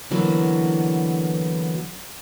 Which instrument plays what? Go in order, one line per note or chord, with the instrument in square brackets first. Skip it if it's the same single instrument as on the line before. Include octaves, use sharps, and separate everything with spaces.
[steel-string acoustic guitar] D3 E3 F#3 A#3 B3